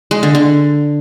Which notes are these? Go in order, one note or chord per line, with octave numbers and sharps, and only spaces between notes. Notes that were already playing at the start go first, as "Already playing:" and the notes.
G#3
D3
D3